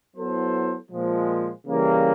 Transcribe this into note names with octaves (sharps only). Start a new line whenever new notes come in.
F#3 B3 E4 A4 C5
A#2 F3 G#3
C#3 E3 G3 A#3